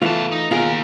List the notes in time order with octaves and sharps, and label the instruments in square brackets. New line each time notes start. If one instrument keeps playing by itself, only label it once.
[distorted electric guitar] E2 A5 [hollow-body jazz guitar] E3 A3 F4
[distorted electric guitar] D#4
[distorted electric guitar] D#2 A#4 [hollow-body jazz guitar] B2 F4 G#4